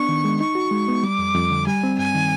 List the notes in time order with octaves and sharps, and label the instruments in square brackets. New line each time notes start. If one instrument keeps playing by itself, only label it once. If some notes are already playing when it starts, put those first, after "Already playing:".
Already playing: [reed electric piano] B3 D4 [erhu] C#6
[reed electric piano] D#3
G#3
[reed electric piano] D#4 [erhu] C#6
[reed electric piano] F#4
G#3
B3
[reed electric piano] G3 [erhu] D6
[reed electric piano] F2
F2
D3
[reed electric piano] G3 [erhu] G#5
[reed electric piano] C4
[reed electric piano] G2 [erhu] G#5
[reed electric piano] D#3